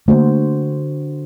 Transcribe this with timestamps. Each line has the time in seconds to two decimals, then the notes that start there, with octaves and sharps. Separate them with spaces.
0.08 D3 A3 A#3 F#4 C5